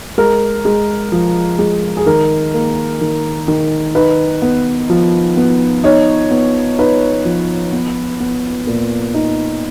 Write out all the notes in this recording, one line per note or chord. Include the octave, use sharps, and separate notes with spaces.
G#3 A#4
G#3
F3
G#3
G#4
D#3 A#4
A#3
D#3
D#3
D#4 B4
B3
F3
B3
D#4 C#5
B3
D#4 B4
F3
B3
B3
A#2
D#4